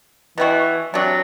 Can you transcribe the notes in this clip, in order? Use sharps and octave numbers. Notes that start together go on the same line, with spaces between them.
B2 E3 G3 B3 F#4
C3 F#3 G3 D4